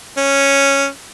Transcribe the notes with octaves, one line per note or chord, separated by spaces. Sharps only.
C#4